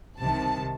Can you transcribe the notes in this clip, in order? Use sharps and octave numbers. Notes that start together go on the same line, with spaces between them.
C2 C3 D#3 A5